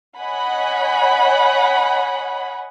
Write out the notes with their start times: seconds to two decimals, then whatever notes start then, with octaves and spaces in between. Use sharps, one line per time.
0.19 C#5 D#5 F#5 G#5 B5